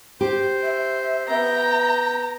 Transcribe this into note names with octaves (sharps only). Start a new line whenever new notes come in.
G4 C5
E5
B3 G5 A#5